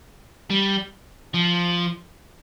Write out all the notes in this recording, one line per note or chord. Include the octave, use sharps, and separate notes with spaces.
G3
F3